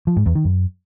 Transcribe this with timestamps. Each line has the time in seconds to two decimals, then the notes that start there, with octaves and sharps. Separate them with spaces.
0.07 F3
0.17 G#2
0.26 E2
0.35 D#3
0.45 F#2